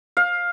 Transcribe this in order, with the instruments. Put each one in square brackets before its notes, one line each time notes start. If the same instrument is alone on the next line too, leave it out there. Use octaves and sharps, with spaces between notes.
[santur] F5